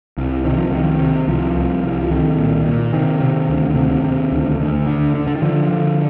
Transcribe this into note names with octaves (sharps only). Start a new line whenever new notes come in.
C2
C3 D#3
F3
C2 D#3
C3
C2 F3
C2
C2
F3
C2 D#3
A#2
A#2
C3 D#3
C3
D2
C3
C3
D2
D2
D3
D3
D3
D#3
D3 F3
D3